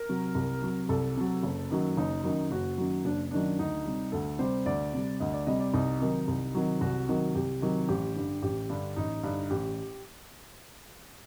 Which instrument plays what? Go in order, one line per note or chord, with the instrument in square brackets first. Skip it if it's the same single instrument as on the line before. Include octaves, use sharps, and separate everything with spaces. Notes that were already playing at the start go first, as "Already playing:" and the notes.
Already playing: [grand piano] A#4
C3 F#3
C2
C3 F#3
C2 A4
C3 F#3
F#1
F#2 D#3 F#3
F#1 D#4
F#2 D#3 F#3
F#1 F#4
F#2 D#3 F#3
F#1 D4
F#2 D#3 F#3 D4
D2 D#4
C3 G3
D2 A4
C3 G3 C5
D2 D5
C3 G3
D2 D#5
D5
C3 G3 D#5
D5
C2 D#4
C3 D#3 F#3
C2
C3 D#3 F#3
C2 F#4
C3 D#3 F#3
C2 G4
C3 D#3 F#3
A1 G4
G2 D3
A1 G4
G2 D3
A1 D#4
G2 D3
A1 G4